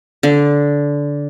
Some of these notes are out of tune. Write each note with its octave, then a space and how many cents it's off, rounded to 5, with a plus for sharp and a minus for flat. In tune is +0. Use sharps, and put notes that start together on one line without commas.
D3 -15